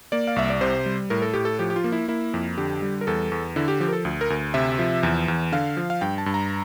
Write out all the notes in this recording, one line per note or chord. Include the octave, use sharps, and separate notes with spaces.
A#3 D5
F5
C2 E5
D5
C3 C5
G3
A2 A#4
A4
A2 G4
A4
F3 G4
G4
F4
A#3
E4
A#3 E4
F2
D3 G4
G3
A#4
E2 A4
E2
D3 E4
G4
F3 G4
A#4
A4
D2
A#4
D2
C3 E5
F3
E2
E2
D3 F5
F3
F5
G2 G5
A5
G2
A#5